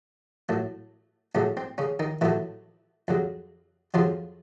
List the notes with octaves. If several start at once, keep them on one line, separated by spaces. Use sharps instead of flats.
A2 F#3 A3
A2 C#3 F#3 A3 C#4
C4
C#3 C#4
D#3 D#4
A2 E3 F#3 A3 E4
F2 C#3 F#3
F2 C#3 F3 F#3 F4